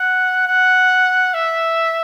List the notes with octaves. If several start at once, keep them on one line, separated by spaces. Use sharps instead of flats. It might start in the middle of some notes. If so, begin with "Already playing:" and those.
Already playing: F#5
F#5
E5